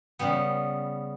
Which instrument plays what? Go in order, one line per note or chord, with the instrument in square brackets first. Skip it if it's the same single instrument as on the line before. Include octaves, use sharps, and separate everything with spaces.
[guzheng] C#3 G3 B3